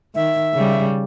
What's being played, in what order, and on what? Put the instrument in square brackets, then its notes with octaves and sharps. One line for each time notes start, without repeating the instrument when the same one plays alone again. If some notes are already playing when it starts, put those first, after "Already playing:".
[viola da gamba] D#3 [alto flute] E5
[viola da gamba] C#3 G3